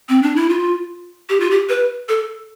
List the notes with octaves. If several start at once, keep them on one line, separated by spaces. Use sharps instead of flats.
C4
D4
E4
F4
G4
F4
G4
B4
A4